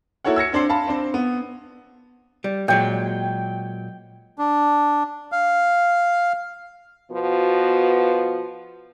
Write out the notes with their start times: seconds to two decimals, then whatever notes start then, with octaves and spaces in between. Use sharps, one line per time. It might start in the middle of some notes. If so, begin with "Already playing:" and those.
0.24 A#3 E4 F#4 A4 C#5 F#5
0.36 E6 G#6 A#6 C#7
0.53 C4 D4 C6 C7
0.69 F5 A5 B5
0.87 C4 D4 C5
1.14 B3
2.44 G3
2.68 A#2 F#3 G#3 G5
4.38 D4
5.32 F5
7.11 B2 F3 B3 F#4